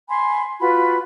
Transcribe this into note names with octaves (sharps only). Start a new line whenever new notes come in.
G#5 B5 C6
F4 F#4 B4 B5